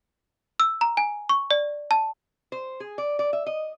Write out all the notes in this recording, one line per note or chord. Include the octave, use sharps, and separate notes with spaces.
E6
A#5
G#5
C#6
D5
A5
C5
G#4
D5
D5
E5
D#5